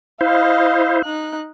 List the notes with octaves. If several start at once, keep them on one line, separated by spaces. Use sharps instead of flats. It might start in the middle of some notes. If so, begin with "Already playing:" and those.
E4 C5 D#5 F5
D#4 F#6